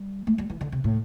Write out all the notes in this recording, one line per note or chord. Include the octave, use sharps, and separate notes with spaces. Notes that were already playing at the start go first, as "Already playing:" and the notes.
Already playing: G3
A3
G3
E3
D3
C3
A2